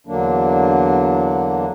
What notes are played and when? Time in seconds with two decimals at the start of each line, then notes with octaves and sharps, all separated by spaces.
0.07 E2 D3 F#3 A#3 D4